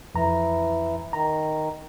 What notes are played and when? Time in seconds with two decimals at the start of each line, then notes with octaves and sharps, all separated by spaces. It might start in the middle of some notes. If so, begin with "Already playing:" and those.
0.15 F2 E3 A#5
1.13 D#3 A#5